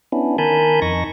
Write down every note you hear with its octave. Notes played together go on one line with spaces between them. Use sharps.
B3 C#4 D4 E4
D#3 A#4 G#5 A5 B5 G6
F2 D#4 C#6 A#6